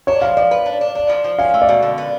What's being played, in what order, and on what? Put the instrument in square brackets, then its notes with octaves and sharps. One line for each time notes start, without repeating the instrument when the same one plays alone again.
[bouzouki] D4 [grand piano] C#5
[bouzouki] F3 [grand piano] F5
[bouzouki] F3 [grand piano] D5
[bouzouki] B4
D4
D4
D4
F3
F3
[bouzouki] C#4 [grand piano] F5
[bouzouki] A3
[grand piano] D5
[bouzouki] B2
D3
B3